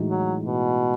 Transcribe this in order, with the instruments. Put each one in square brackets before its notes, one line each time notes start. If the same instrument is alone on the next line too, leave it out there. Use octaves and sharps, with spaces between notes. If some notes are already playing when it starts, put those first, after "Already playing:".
Already playing: [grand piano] A2 E3 G#3 D#4 F#4
[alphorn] F#3
B2